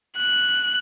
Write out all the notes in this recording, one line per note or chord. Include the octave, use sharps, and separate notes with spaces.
F#6